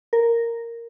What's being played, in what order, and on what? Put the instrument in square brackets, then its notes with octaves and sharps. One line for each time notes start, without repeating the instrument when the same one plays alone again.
[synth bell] A#4